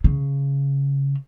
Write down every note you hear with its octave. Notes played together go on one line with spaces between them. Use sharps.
C#3